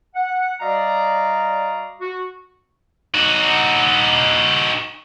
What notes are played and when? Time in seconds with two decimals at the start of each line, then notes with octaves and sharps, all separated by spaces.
0.15 F#5
0.60 G3 F#4 D5 D#5 F5 A#5
2.01 F#4
3.15 D#4 F#4